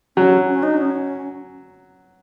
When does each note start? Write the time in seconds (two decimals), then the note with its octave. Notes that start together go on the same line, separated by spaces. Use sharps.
0.16 F#3 C#4
0.50 C#4
0.63 D#4
0.77 C#4